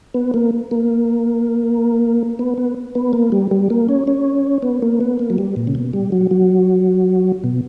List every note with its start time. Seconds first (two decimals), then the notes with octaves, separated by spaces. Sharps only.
0.14 B3
0.34 A#3
0.71 A#3
2.39 B3
2.58 B3
2.95 B3
3.13 A#3
3.32 G3
3.51 G3
3.70 A#3
3.89 C#4
4.07 C#4
4.62 B3
4.82 A#3
5.01 B3
5.19 A#3
5.30 F#3
5.38 G3
5.56 A#2
5.67 C#3
5.75 B2
5.93 G3
6.12 F#3
6.31 F#3
7.44 B2